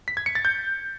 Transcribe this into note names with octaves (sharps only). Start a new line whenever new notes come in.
B6
G#6
C#7
A6
G6